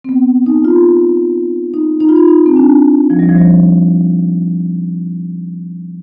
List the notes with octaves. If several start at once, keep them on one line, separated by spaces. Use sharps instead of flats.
C4
B3
D#4
F4
D#4
D#4
F4
D#4
D#4
C4
D4
F3
G3
F3
G3